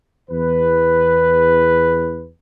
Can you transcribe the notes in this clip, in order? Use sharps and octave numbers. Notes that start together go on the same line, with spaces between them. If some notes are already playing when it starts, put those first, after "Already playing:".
E2 B4